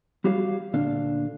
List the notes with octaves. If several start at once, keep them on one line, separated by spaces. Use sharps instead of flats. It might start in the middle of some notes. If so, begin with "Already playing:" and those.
G3 F#4 G4 C#5 F5
D2 A#2 D3 D4 F5